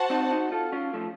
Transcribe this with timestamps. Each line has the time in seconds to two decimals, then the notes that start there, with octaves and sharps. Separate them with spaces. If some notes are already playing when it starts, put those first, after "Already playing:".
Already playing: F#4 C5 F#5 A5
0.10 C4 D#4
0.31 D#4 F#4
0.52 F4 A4
0.72 C#4 F4
0.93 F3 A3